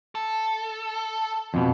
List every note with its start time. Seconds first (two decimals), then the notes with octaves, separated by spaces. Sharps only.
0.15 A4
1.54 F2 B2